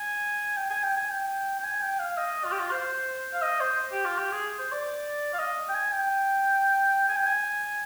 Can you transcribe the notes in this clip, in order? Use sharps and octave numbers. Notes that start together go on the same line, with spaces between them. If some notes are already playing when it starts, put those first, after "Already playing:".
Already playing: G#5
G5
G#5
G5
G#5
G5
G5
G#5
G5
F5
D#5
F4
G4
F4
C5
F5
D#5
C5
G4
F4
G4
G#4
C5
D5
F5
D#5
G5
G#5
G5
G#5
G5
G#5